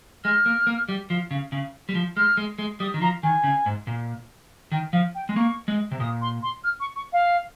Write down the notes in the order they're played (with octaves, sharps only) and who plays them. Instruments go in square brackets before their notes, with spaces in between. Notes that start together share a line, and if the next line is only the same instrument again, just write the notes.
[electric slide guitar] G#3 [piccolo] F6
[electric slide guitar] A#3
A#3
G3
F3
C#3
C#3
G3
F3
[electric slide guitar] G#3 [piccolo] F6
[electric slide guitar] G#3
G#3
[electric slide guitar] G3 [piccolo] D#6
[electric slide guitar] D#3
[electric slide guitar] F3 [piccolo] A#5
[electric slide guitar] D#3 [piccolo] G#5
[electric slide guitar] C#3
G#2
A#2
[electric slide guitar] D#3 [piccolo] G5
[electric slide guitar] F3 [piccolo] F5
[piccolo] G5
[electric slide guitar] G#3
[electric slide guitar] A#3 [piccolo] C#6
[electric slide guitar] G#3
C3
[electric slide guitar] A#2 [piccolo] D#6
[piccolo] C6
C6
F6
C#6
C#6
F5